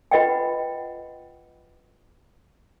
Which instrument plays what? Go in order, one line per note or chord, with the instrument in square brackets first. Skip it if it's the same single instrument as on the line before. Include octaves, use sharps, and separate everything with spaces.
[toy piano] F4 B4 D#5 F#5 G5